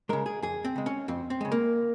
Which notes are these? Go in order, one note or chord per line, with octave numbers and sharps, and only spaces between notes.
C#3 G#3 A#4
G#4
F2 G#4
C4
C#3 G#3
C#4
F2 C4
C4
C#3 G#3
A#3